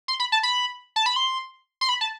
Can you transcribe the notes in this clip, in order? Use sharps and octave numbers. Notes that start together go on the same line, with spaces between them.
C6
B5
A5
B5
A5
B5
C6
C6
B5
A5